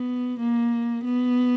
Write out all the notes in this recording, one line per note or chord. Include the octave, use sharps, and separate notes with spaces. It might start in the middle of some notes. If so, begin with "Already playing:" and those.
Already playing: B3
A#3
B3